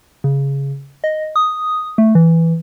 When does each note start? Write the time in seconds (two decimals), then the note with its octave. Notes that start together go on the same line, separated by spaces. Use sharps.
0.24 C#3
1.04 D#5
1.36 D#6
1.98 A3
2.15 E3